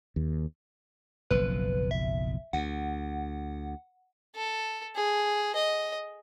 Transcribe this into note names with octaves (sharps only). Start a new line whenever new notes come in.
D#2
F#1 B1 F3 B4
E5
D2 F#5
A4
G#4
D#5